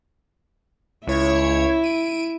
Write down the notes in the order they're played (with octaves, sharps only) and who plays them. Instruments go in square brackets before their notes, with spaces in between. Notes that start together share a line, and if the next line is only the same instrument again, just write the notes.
[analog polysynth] C#2 C#5 G#6 [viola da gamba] E4
[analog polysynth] D7 D#7